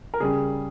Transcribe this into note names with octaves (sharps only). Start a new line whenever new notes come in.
A#4
C#3 G3 C#4 G#4